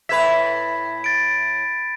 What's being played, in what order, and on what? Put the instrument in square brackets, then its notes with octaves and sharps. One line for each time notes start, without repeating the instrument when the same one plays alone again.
[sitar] A2 B4 E5 [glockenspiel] B5 G#6 B6
[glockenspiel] A6 D7